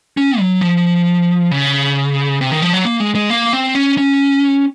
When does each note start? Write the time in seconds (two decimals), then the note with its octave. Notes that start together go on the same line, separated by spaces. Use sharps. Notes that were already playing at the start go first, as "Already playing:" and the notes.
0.17 C#4
0.39 F#3
0.61 F3
1.51 C#3
2.41 C3
2.52 D#3
2.62 F3
2.73 F#3
2.85 A#3
3.00 G#3
3.15 G#3
3.30 A#3
3.53 C4
3.75 C#4
3.98 C#4